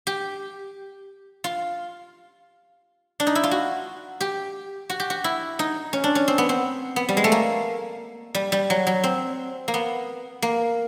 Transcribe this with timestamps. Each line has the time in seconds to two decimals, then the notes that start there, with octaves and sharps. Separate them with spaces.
0.07 G4
1.44 F4
3.20 D4
3.27 D#4
3.35 E4
3.44 F4
3.51 F#4
4.21 G4
4.90 F#4
5.00 G4
5.10 F#4
5.24 E4
5.59 D#4
5.93 C#4
6.04 D4
6.15 C#4
6.28 C4
6.38 B3
6.49 C4
6.96 B3
7.09 G3
7.17 G#3
7.24 A3
7.32 A#3
8.35 G3
8.52 G3
8.70 F#3
8.87 F#3
9.04 C4
9.68 A#3
9.74 B3
10.42 A#3